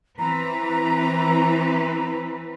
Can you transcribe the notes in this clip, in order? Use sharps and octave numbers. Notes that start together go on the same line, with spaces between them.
E3 C4 B4 A#5